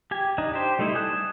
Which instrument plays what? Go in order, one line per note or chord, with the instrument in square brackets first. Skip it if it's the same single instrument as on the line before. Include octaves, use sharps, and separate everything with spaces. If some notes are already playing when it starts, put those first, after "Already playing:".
[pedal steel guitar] G4 G#5
D4 D#4
G4 C5
G3 A3 D#4 E4 C5
G#5 A5 D#6 F#6